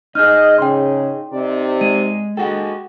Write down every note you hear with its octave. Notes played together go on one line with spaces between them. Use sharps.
D#4 G#4 D#5 F6 G6
C#3 G5 C6
C3 D#4 D5
G#3 D#7
G#3 F#4 A4 F#5 G5